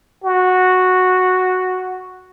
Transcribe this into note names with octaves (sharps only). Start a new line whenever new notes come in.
F#4